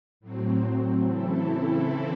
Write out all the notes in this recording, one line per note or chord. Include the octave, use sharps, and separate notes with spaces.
A2 F#3 C4
C#3 E3 C4 E4 A4